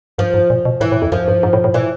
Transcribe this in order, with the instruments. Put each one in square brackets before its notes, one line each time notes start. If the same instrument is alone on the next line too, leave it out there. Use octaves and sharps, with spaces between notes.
[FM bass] G2 [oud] F3
[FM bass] G#2
A#2
B2
[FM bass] A2 [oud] E3
[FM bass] A2
F2
[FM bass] F#2 [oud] F3
[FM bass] G2
G#2
A2
A2
[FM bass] A#2 [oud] E3